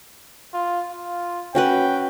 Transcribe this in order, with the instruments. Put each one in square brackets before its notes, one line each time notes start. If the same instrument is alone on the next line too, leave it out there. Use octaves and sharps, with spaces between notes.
[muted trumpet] F4
F4
[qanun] C#4 F#4 B4 [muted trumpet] G5